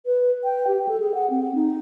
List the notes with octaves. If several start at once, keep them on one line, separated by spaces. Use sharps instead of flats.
B4
G5
G4
A4
G#4
F#5
C4
D#4